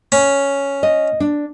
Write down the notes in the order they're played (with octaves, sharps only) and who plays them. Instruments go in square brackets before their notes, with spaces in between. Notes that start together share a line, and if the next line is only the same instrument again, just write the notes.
[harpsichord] C#4
[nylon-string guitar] D#5
D4